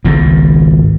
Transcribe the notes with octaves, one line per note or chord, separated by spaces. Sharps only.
G#1 C#2 G#2